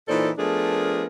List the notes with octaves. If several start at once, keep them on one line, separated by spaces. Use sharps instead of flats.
A#2 E3 D#4 A4 C5 D5
F3 A3 B3 D4 G#4 A#4